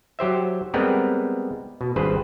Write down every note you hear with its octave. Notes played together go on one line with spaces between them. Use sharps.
F#3 G4 C5 E5
G3 G#3 B3 C4 A#4 B4
B2
G#1 G2 G#4 B4 C5